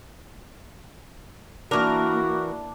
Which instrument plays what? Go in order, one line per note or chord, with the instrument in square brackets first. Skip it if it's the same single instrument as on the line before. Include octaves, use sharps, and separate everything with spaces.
[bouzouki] E3 A#4 [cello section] A#3 E4 [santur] D4 [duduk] F#4